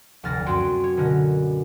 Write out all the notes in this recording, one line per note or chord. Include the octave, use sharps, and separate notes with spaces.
F1 D2 G3 F6 A6 A#6
F#2 C4 F#4 C#5 C6 D7
C#5
B2 D3 C#4 A#4